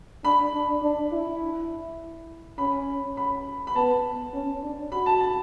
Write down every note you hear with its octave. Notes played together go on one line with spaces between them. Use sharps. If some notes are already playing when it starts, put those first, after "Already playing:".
D4 B5
D4
D4
E4
C#4 B5
B5
B5
B3 A5
C#4
D4
F#4 B5
A5
A5